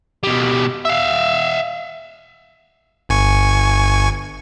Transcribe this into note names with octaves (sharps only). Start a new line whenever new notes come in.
B2 G3
E5 F5
G1 G#5 C#6